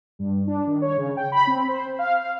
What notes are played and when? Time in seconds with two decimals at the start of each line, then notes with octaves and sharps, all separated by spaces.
0.19 G2
0.47 D4
0.67 D#3
0.82 C#5
0.97 C#3
1.17 G5
1.32 B5
1.47 C4
1.68 C5
1.99 F5